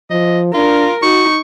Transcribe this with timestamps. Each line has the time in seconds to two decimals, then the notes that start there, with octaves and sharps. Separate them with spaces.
0.11 F3 D#5
0.54 D4 F4 A#4
1.03 D#4 F#4 C#6